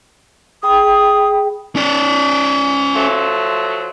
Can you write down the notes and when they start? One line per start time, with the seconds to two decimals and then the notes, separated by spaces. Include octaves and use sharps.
0.63 G#4 G5 B5 D#6
1.76 C#4 D5
2.94 F3 F#3 A3